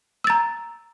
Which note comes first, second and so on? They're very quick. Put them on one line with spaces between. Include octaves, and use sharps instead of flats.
E6 A6 A#5